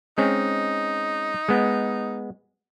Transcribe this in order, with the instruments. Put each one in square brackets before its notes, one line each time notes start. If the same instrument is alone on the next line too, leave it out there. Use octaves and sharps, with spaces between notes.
[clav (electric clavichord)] G#3 C4 C#4 [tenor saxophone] D#4
[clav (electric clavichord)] G#3 B3